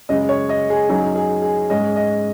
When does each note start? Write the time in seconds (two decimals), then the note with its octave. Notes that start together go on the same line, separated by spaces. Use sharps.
0.09 F#2 C#3 G#3 D#5
0.29 C#5
0.49 D#5
0.70 G#4
0.89 F#2 F#3 D#4 G#4
1.16 G#4
1.42 G#4
1.69 G#2 G#3 C#4 D#5
1.96 D#5